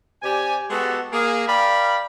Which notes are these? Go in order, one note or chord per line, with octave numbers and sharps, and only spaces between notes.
C3 G4 D5 G#5
G#3 B3 F#4 G4 A4
A#3 G#4
A#4 D5 F5 G5 B5